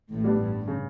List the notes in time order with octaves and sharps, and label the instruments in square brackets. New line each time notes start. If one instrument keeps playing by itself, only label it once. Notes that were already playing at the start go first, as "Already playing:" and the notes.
[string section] A1 A2
[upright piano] G3 B3 D4
[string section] G2
[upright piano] C#3